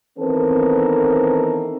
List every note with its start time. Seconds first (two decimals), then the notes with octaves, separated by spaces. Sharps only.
0.18 D#3 E3 B3 C4 A4 A#4